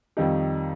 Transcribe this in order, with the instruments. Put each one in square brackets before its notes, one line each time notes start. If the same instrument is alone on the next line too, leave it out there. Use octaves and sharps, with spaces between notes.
[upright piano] F2 D#3 G3 D#4 G4